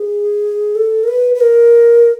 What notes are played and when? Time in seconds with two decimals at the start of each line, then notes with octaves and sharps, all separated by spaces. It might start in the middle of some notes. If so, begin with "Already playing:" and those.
Already playing: G#4
0.75 A4
1.03 A#4
1.08 B4
1.35 B4
1.40 A#4